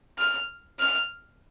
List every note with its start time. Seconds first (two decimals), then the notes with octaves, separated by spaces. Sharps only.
0.18 F6
0.79 F6